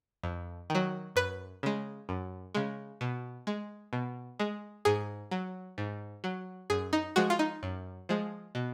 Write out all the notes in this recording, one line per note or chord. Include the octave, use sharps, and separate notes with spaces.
F2
D#3 F#3
F#2 B4
C#3 G#3
F#2
C#3 G#3
B2
G#3
B2
G#3
G#2 G#4
F#3
G#2
F#3
F#2 G#4
D#4
F3 G#3 F#4
F4
D#4
F#2
F3 G#3
B2